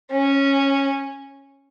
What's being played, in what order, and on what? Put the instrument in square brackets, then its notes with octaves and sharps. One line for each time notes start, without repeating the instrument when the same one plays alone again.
[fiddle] C#4